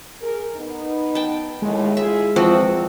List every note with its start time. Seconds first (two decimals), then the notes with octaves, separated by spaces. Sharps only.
0.21 G#4 A#4
0.57 B3 D#4
1.15 G5 A5
1.62 D#2 A2 G#3
1.97 E4 F4 G#4 E5
2.36 E2 F3 C4 F#4